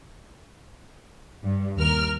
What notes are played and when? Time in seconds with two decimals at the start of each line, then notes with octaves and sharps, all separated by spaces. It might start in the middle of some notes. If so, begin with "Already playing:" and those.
1.43 G2
1.78 D#2 A#4 F6